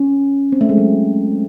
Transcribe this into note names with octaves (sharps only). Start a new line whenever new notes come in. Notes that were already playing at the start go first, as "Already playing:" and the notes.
Already playing: C#4
C4
A3
G#3
F#3